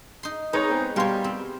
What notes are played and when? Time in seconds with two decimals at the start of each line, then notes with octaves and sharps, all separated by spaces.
0.23 D#4 C6
0.53 G#3 D#4 B4 C#5 A#5
0.69 B3 C4 G#4
0.96 B2 G3 A#4 C#5 F5 C6
1.24 C4